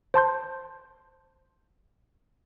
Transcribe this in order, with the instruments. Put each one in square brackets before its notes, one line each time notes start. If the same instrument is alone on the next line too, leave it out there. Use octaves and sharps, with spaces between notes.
[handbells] C5 A5 C6 G6